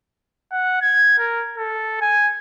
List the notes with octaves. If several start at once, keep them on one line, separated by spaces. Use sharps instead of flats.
F#5
G#6
A#4
A4
G#5